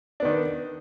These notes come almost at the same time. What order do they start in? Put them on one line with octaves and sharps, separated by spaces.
D4 B3 D#3